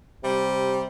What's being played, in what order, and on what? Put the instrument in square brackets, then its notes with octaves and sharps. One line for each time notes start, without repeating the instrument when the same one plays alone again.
[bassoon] C3 [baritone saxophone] G3